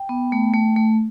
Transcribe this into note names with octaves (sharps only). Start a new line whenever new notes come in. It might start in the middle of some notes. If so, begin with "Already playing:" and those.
Already playing: G5
B3
A3
A3
A3